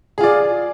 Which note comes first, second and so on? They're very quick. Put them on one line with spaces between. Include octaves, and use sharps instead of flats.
G#4 F4 D5